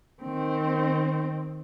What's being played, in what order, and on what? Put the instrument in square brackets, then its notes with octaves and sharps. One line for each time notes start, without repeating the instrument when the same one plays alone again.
[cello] D#3 C4